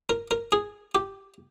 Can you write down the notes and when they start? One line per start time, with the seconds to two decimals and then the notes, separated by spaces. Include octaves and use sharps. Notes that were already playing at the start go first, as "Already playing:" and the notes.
0.09 A#4
0.31 A#4
0.52 G#4
0.95 G4